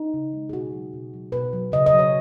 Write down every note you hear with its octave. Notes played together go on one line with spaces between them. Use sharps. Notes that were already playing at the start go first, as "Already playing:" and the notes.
Already playing: D#4
C#3
G#3
G#4
B2 F#4
F#3
B2
F#3
B2 B4
F#3
C#3 D#5
D#5
F#3
C#5